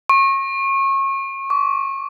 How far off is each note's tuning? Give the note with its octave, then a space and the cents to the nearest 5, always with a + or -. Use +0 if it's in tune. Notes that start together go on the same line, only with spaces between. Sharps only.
C#6 -30
C#6 +45